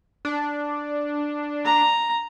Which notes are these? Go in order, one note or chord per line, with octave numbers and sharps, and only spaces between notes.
D4
A#5